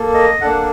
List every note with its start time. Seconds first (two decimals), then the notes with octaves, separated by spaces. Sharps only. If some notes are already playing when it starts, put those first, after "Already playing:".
Already playing: A#3 A4
0.14 D#5
0.41 A#3 D4 A4 F#5